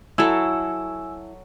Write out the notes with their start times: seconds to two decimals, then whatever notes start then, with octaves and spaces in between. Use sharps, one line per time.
0.18 F#3 E4 A4 G#5 E6